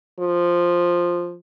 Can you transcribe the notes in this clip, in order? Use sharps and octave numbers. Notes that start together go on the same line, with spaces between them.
F3